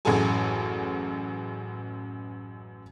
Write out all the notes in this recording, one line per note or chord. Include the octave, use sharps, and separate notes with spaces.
A1 F#2 F#4 G#4 A4 G#5